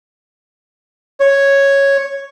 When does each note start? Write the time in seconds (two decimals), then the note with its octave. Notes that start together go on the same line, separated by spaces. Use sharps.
1.20 C#5